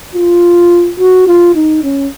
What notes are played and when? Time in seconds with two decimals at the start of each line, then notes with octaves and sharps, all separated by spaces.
0.15 F4
1.00 F#4
1.27 F4
1.55 D#4
1.84 C#4